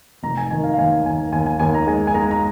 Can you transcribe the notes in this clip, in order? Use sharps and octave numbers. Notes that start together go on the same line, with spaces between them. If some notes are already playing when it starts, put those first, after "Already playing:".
F1 A#5
G#5
D#3 G#5
F5
F5
D#2 G#5
D#2 G#5
D#2 G#5
G#5
D#2 G#5
A#5
G#3 G#5
G#5
G#3 A#5
A#5